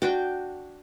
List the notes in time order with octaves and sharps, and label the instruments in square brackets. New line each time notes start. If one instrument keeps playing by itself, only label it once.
[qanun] D4 F#4 G5